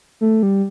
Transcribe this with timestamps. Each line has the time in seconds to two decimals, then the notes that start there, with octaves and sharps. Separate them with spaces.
0.21 A3
0.43 G3